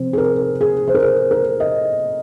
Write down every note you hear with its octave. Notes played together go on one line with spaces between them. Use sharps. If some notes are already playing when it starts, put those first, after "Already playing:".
Already playing: C3 F3 C4 C5
G#4
A#4
G#4
C5
A#4
G#4
A#4
D#5